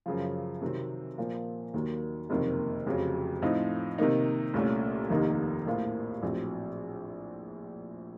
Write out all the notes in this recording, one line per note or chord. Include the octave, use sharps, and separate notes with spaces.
F#2 C#3 F3
C3 D#3 F#3 C4
A#2 F3 A#3
D#2 D#3 F#3 A#3
F#1 F2 C3 D#3 A#3
F1 F2 C#3 F#3
A2 F3 C4 D#4
C3 D#3 A#3 D#4
C2 A#2 A3 C#4
F1 D#2 D#3 A#3 D#4
A#1 A2 F3 A#3 F4
A#1 A2 F#3 C4